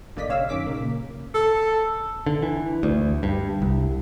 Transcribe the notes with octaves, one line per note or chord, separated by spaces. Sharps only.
G1 D3 A#3 D5 D#5 B6
A#1 C#3 C#5 F5 E6
F#2 D#3 C#4 D6 B6
A#2 C#3 A#3
A4
D3
E3
D2
G2
C2